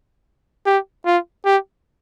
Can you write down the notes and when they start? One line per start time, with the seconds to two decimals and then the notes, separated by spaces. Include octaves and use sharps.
0.66 G4
1.06 F4
1.45 G4